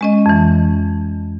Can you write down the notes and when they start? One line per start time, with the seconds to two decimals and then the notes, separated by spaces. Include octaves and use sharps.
0.01 G#3 C#4 D#5
0.26 F2 E3